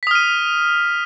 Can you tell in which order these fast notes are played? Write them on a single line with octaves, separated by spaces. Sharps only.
B6 D#6 F6 D#7